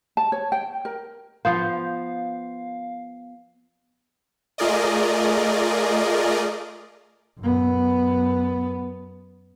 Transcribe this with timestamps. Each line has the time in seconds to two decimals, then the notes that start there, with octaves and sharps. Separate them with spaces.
0.17 A5
0.32 C#5
0.52 G5
0.85 A#4
1.45 F3 B3 C5 F5
4.58 A3 F4 G#4 A#4 D5 D#5
7.40 F#2 B3